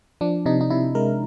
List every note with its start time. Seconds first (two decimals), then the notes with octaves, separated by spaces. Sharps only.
0.21 F3 D4
0.46 C3 D#4
0.61 D#4
0.70 C3 E4
0.95 G#3 A#4